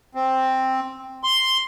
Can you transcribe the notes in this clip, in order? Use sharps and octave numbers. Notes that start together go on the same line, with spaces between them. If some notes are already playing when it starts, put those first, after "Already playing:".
C4
C6